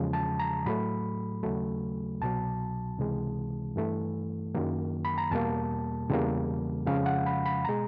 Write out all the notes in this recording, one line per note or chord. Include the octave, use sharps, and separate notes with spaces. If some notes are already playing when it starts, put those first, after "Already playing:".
Already playing: E2 C#3 F3 G#3
A5
A#5
A2 F#3 A3 B5
D#2 C#3 F#3 A3
C2 B2 F#3 A5
C#2 C3 E3 G#3
G2 E3 A3
F#2 D#3 F#3 A#3
B5
A#5
E2 B2 G3 A#3 A5
E2 C#3 E3 G3 A#3
F2 C#3 F3 G#3 F5
F#5
B5
B5
B2 G#3 A#5